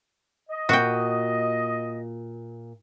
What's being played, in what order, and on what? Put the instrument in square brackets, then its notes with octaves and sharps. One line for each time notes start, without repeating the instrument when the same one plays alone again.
[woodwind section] D#5
[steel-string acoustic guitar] A#2 [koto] F#4 G5